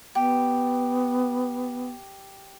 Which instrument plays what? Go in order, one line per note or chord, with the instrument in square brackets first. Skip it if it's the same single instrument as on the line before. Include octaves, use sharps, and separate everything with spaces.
[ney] B3 [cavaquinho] G4